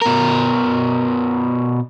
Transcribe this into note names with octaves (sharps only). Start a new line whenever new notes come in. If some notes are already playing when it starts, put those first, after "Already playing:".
B2 A#4